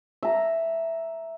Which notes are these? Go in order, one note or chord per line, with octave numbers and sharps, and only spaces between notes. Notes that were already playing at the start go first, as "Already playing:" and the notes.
E5 A#5